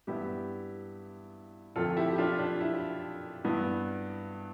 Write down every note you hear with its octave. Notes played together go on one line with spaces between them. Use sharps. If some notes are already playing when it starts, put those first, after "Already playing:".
G2 E3 B3 E4 G4
F2 D3 F3 A3 F4 A4
E4 G4
G4
D4 F4
D4
E4
G2 E3 B3